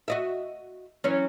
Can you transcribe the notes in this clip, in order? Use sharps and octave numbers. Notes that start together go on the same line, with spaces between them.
F#4 D#5 E5
E3 F#3 C#4